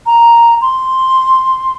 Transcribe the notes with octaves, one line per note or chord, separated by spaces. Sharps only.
A#5
C6